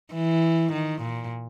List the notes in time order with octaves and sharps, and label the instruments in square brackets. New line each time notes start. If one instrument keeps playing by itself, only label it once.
[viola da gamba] E3
D#3
A#2